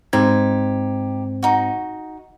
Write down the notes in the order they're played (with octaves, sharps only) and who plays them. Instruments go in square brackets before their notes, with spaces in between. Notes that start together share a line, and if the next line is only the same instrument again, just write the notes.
[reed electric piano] G#2 C4 G#6 [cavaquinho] D#4 G4
[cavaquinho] D#4 F#4